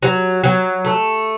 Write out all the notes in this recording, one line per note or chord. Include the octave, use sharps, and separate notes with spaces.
F#3
F#3
A3